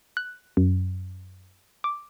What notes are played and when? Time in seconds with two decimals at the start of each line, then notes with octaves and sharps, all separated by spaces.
0.17 F#6
0.57 F#2
1.84 D6